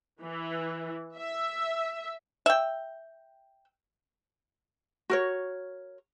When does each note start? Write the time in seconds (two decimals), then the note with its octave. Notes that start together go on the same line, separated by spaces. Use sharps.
0.21 E3
1.17 E5
2.46 E5 G5
5.10 F#4 A#4 C#5